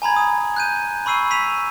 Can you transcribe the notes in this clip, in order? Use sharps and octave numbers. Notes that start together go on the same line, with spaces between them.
G#5 A#5 B5 G#6
D#6
F#6 G6 D#7
B5 C#6 E6 C7 D#7
B5 B6 D#7 F7